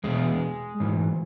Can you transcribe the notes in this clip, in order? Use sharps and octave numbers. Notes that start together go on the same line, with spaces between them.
E2 B2 G#3
G#2 E3